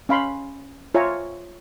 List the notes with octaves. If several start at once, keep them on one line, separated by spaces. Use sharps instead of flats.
C#4 F5 B5 C6
F4 C#5 E5 G#5 A#5